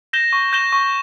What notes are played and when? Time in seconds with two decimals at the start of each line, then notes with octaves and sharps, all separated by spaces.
0.13 G6 A#6 E7 G7
0.33 C#6
0.53 G6 A#6 E7 G7
0.73 C#6